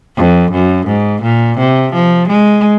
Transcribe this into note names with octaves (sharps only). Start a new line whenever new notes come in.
F2
F#2
G#2
A#2
C3
F3
G#3